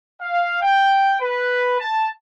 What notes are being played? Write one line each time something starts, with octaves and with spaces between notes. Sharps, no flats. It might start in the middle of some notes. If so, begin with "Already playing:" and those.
F5
G5
B4
A5